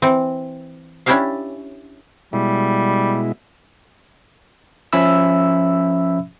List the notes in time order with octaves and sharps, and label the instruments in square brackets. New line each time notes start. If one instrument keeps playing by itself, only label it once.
[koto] E3 C4
C#4 D4 E4 G4 E5 F5
[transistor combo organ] B2 G#3 E4 [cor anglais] G3
[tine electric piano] F3 C#4 E5 B5 E6